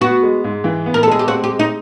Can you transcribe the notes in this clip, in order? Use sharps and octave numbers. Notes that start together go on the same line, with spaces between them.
B3 F#4
G#3
G#2
E3
B3
A#4
A4
G#3 G#4
G4
C4 F#4
G4
G#3
D#4